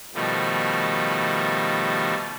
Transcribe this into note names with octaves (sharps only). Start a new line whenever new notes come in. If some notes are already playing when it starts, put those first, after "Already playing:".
B2 D#3 F3 G3 A3